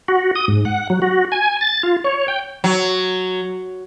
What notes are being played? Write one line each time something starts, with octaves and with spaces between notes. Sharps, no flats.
F#4
D#6
G#2
F#5
F#3
F#4
G#5
A6
F4
C#5
G5
F#3